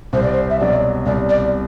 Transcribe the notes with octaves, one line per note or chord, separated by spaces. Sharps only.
C2 C5
D5
C5
E5
B2 F#3 D5
C2 D5
D5